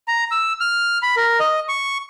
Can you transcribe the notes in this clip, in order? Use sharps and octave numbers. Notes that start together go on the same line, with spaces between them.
A#5
E6
F6
B5
A#4
D#5
C#6